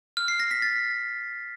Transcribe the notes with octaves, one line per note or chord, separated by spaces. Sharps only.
F6
C7
A#6
B6
A6